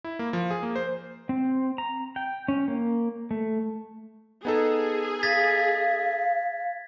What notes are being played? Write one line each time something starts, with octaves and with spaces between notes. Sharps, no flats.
E4
A#3
F3
G#4
A#3
C5
C4
A#5
G5
C#4
A#3
A3
B3 D#4 G#4 A4
F5 G#6 A6 B6